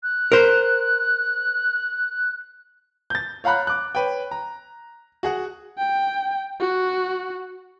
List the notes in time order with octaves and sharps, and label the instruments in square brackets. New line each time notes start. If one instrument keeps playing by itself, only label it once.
[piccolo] F#6
[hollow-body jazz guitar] A#4 C5
[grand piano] G6 A6
C#5 F5 F#5 A#5 B5 F#6
D6 F#6
B4 C#5 G5
A#5
F#4 G#4 F#5
[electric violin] G5
F#4